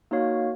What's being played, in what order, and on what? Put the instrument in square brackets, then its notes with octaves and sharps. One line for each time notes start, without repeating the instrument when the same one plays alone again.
[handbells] A#3 D#4 F#4 C#5 F5